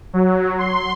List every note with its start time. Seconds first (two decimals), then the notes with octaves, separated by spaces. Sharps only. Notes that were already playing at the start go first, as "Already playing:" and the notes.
0.13 F#3
0.59 C6